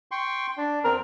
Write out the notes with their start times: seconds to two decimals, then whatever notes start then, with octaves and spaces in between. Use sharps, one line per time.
0.11 G5 C6 C#6
0.57 D4
0.84 E2 C4 A#4